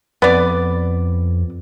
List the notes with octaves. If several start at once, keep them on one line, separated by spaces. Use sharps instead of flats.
F2 B3 D5